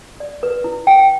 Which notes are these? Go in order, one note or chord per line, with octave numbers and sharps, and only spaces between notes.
D5
B4
E4
G5